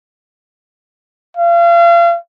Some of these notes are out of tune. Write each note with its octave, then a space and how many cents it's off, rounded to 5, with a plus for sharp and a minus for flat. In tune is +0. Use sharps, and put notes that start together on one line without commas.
F5 -35